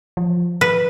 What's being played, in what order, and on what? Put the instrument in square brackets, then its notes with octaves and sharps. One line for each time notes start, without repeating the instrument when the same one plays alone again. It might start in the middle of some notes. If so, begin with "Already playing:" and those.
[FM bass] F3
[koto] B4